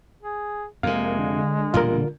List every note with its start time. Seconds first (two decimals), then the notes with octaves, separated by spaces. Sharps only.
0.22 G#4
0.83 F2 C3 G#3 A#3 F5
1.18 D3
1.74 E1 A#2 G3 F4 A#4